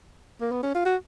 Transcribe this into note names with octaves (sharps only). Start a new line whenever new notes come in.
A#3
B3
C#4
F4
F#4